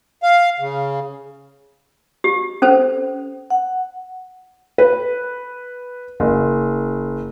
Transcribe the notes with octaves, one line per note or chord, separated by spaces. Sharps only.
F5
C#3
G4
C#4 A4 C5
F#5
B4
F#1